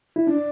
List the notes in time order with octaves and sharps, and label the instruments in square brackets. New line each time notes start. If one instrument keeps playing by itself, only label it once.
[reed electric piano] E4
[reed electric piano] D4 [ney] D5